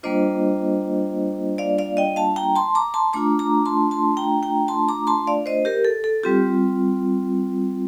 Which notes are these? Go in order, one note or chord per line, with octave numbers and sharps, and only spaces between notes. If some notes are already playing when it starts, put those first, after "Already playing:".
G3 A#3 D4 F4 C5 D#5
D5 F5
D5 F5
D#5 G5
F5 A5
G5 A#5
A5 C6
A#5 D6
A5 C6
A3 D4 F4 A#5 D6
A#5 D6
A5 C6
A5 C6
G5 A#5
G5 A#5
A5 C6
A#5 D6
A5 C6
D5 F5
C5 D#5
G4 A#4
A4
A4
G3 C4 F4 G4